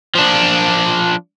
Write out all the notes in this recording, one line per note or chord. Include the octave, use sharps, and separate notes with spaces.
F3 D4